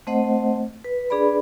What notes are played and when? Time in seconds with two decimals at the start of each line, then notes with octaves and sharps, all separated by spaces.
0.07 A3 C4 C5 D#5 F#5
0.84 B4
1.10 D4 G#4 B4 D5 B5